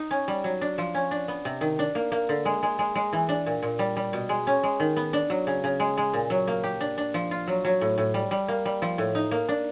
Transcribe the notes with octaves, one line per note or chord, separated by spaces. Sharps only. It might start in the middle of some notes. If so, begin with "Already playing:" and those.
Already playing: D#4
C#4
G3
F#3
D4
F3
C#4
D4
B3
C3
D#3
D4
A#3
A#3
D3
G#3
G#3
G#3
G#3
E3
D4
A#2
A#2
G3
G3
B2
G#3
C#4
G#3
D#3
B3
D4
F#3
C#3
C#3
G#3
G#3
A#2
F#3
A#3
G4
D4
D4
F3
F4
F#3
F#3
A2
A2
G3
G3
A#3
G3
F3
A2
D#4
A#3
D4